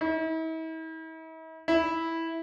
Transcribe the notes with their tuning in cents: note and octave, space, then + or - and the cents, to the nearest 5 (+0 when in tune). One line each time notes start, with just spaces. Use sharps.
E4 -45
E4 -10